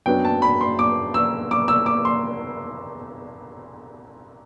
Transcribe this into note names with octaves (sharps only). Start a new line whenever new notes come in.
F#2 F#3 B3 D4 G5
A5
B5
C6
D6
E6
D6
E6
D6
C6